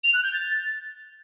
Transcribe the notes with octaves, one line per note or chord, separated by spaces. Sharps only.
F7
F#6
G6
A6